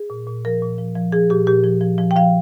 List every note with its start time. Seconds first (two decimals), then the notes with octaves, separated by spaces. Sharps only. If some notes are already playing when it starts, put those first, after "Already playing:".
Already playing: G#4
0.10 A#2
0.27 A#2
0.45 F3 A#4
0.62 A#2
0.78 F3
0.95 F3
1.12 F3 G#4
1.30 A#2 G4
1.47 A#2 G4
1.64 F3
1.81 F3
1.98 F3
2.11 G5
2.16 F3 F5